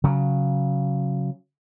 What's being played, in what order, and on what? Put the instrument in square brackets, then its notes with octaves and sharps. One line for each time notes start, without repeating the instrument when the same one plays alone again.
[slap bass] C#3 F#3